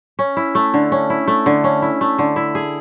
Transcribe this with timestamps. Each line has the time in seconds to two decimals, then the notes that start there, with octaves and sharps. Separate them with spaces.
0.19 C#4
0.37 E4
0.55 A3
0.74 D3
0.92 C#4
1.10 E4
1.27 A3
1.46 D3
1.64 C#4
1.82 E4
2.01 A3
2.19 D3
2.36 E4
2.55 G#4